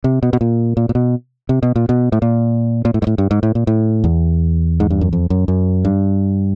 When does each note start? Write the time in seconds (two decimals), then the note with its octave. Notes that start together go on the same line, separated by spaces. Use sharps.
0.04 C3
0.23 B2
0.33 B2
0.41 A#2
0.77 A#2
0.89 A#2
0.95 B2
1.49 C3
1.63 B2
1.76 A#2
1.89 B2
2.12 A2
2.22 A#2
2.85 A#2
2.94 A2
3.02 G#2
3.07 A2
3.18 G2
3.31 G#2
3.43 A2
3.55 A#2
3.67 A2
4.04 E2
4.80 G#2
4.90 G2
5.01 F#2
5.13 F2
5.30 F#2
5.48 F#2
5.85 G2